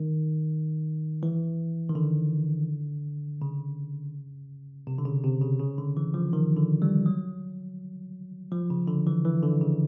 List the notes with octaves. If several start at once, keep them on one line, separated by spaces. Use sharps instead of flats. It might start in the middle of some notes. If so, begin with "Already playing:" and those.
Already playing: D#3
E3
D#3
D3
C#3
C3
D3
C#3
C3
C#3
C#3
D3
E3
F3
D#3
D3
G3
F#3
F3
C#3
D3
E3
E3
D3
C#3